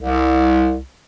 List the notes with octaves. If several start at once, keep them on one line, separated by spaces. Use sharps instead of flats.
C2